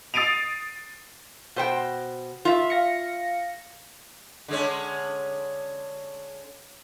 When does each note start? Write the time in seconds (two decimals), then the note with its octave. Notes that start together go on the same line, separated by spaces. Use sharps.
0.14 D#6 A6 C7 D7 D#7 F7
1.56 B2 C5 G5
2.45 F4 E5
2.70 F5 A#6 C#7
4.48 D3 G#3 C#4